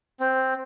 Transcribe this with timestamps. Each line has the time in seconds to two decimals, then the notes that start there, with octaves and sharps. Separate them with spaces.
0.20 C4